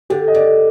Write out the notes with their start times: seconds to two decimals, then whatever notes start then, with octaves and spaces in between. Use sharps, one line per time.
0.10 D3 G4
0.28 D#5
0.34 D3 D5